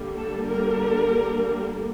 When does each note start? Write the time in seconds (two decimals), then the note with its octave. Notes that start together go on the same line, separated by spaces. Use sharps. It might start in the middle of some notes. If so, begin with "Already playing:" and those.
Already playing: D3 G3 A#3
0.15 A4
0.44 A#4